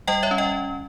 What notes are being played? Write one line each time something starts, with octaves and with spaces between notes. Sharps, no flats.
G3 D#5 G5
C#5 E5
C#4
D#5 G5